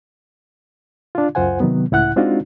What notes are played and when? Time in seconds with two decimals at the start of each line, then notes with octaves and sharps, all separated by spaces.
1.15 D4 F4
1.35 C#2 F#2 F4 C5 F#5 G#5
1.60 C3 D#3 F#3 B3
1.91 C#2 A2 E4 F#5 F#6
2.16 G#3 C4 D4 D#4 F4 F#4